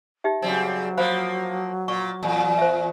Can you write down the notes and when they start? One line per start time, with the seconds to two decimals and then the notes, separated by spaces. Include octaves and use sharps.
0.24 D#4 G4 E5
0.42 C#3 F#3 G3 C4 D#4
0.97 F3 A#3 C5 F5 B5
1.88 A#2 C#6
2.23 E2 A#2
2.58 C5 E5